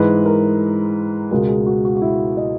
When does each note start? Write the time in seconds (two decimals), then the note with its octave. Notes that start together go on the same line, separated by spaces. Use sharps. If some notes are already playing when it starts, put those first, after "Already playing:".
Already playing: G#2 E3 G#3 B4
0.26 A#4
1.31 C#2 B2 G#3 A#4
1.49 G#4
1.66 F#4
1.85 F#4
1.96 F#4
2.02 E4
2.37 D#5